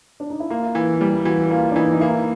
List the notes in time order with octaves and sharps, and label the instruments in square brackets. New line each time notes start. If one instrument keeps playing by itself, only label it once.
[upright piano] D4
D#4
E4
[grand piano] A#3 [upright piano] F4
[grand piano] E3
G3
[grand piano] E3 [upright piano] F#4
[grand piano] A#3 [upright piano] F4
[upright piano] D4
[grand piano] E3 [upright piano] D#4
[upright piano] D#4
[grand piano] A#3 [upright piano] E4